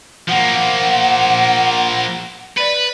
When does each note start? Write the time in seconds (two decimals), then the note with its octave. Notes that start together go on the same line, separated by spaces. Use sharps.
0.28 F3 A#3 F#5
2.58 B4 D5